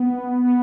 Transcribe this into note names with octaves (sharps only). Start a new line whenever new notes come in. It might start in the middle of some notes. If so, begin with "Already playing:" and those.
Already playing: B3
B3